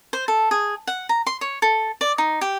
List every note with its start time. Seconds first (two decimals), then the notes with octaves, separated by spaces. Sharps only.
0.13 C5
0.28 A4
0.51 G#4
0.87 F#5
1.09 A#5
1.26 C6
1.41 C#5
1.62 A4
2.01 D5
2.18 D#4
2.41 G4